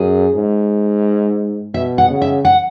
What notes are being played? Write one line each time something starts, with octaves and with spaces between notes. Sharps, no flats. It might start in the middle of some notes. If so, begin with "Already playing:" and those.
Already playing: F#2 G#4
G#2
B2 E5
F#5
C#3
E5
F#5